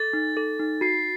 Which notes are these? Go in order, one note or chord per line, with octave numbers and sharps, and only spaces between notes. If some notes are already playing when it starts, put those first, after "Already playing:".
Already playing: A4 A6
D#4
A4
D#4
F#4 C7